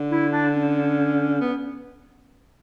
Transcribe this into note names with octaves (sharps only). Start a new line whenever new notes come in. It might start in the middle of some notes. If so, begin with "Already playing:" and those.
Already playing: D3
E4
D4
C#4
B3